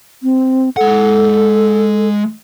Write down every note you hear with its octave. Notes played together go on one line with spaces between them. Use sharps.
C4
G#3 A4 F#5